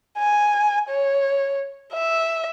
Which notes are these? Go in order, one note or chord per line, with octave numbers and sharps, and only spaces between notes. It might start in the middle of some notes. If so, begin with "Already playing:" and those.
G#5
C#5
E5